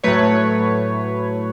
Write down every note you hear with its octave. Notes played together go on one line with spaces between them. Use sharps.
A2 F#3 A3 B4 C#5